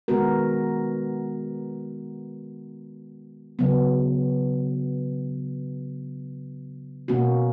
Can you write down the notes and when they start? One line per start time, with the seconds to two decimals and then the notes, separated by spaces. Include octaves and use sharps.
0.08 D#3 G#3 B3 F#4 A#4
3.59 C#3 F#3 B3
7.08 B2 A#3 C#4 F#4